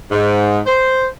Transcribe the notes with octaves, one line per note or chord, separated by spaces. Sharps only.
G#2
C5